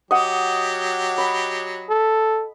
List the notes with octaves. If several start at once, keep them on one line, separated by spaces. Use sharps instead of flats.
F#3 G4 D#5 F#5
B5
A4